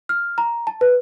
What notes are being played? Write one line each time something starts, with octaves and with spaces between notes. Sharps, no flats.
F6
A#5
A5
B4